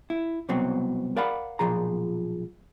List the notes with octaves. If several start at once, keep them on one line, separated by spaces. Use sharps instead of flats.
E4
C2 B2 F#3 C4
A#4 D5 F5 F#5 B5
B1 G2 A#2 F3 G#4 A#5